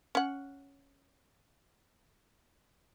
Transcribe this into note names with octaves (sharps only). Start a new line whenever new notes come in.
C#4 F#5